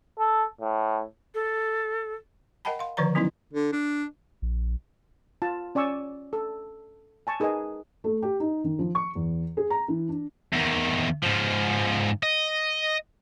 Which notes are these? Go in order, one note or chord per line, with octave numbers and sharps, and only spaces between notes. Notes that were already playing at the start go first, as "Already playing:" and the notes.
A4
A2
A4
A#4 D#5 F#5 G5 A5 B5
F5 C6
D3 D#3 F3 B4 C#5 A#5
F#3 B3 C#4 D#4 E4
D3
D4
A#1
F4 A5
C#4 D5 G#5 C#6 E6
A4
G#5 A5 C#6
D#4 G#4 A#4 B4 D#5 G#5
A3
G4
D#4
D#3
F3
C#6
E2
G#4
A#5
E3
D4
E2 D#3
G#2 F3
D#5